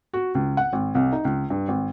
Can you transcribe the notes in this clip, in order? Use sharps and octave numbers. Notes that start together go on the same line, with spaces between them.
F#4
C#2
F#5
G#1
C2
D#4
C#2
G2
G#1